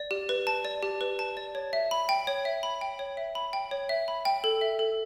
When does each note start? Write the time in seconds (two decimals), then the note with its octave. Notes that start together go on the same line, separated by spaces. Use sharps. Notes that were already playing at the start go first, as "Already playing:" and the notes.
Already playing: D5
0.11 G4
0.29 B4
0.47 A5
0.65 D5
0.83 G4
1.01 B4
1.19 A5
1.37 D5
1.55 C#5
1.73 E5
1.91 B5
2.09 G5
2.27 C#5
2.45 E5
2.63 B5
2.81 G5
2.99 C#5
3.17 E5
3.35 B5
3.53 G5
3.71 C#5
3.89 E5
4.08 B5
4.25 G5
4.44 A4
4.61 E5
4.79 A4